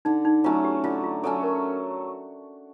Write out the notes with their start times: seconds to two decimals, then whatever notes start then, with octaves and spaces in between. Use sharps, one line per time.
0.05 D3 D#4
0.25 D#4
0.44 F#3 A3 C#4 F4
0.64 G4
0.84 D3 F4
1.04 F4
1.24 F#3 A3 C#4 A4
1.43 A#4